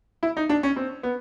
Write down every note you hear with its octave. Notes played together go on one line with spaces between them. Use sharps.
E4
D#4
D4
C#4
C4
B3